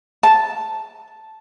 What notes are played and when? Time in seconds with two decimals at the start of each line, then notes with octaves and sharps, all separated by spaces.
0.23 A5